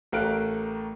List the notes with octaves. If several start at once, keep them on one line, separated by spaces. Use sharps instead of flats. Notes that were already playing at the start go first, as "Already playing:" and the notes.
A1 A3 A#4 F5 F#6 D7